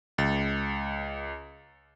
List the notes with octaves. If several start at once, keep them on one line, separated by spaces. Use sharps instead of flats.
C#2 A6